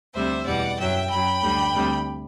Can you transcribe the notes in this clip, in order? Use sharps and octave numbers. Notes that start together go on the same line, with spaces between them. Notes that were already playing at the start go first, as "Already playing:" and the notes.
D2 C3 G3 C5 E5
E2 B2 G3 D5 F#5
F#2 F#3 E5 G5
F#2 F#3 G5 B5
D2 D3 G3
D2 C3 G3